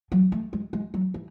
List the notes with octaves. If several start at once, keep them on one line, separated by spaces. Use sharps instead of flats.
F#3
A3
G#3
G#3
F#3
E3